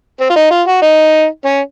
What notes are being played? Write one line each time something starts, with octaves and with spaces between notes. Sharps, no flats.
C4
F4
D#4
F4
F#4
D#4
C#4